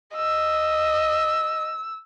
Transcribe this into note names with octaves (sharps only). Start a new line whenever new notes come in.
D#5 E6